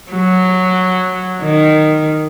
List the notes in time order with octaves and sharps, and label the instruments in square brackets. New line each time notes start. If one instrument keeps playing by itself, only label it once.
[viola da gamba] F#3
D#3